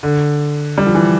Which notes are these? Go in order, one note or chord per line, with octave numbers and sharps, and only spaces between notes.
D3
G3
F3
E3